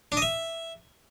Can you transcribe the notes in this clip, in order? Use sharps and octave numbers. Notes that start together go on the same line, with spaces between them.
D4
D#5
E5